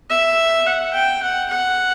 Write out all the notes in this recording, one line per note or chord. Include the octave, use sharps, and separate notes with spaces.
E5
F#5
G5
F#5
F#5